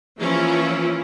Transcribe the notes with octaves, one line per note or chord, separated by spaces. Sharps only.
E3 F3 A#3 C#4 E4 F4